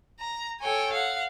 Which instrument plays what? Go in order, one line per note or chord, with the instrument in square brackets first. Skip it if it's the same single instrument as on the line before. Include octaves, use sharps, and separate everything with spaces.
[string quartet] A#5
A4 C#5 G5 G#5
F5 F#5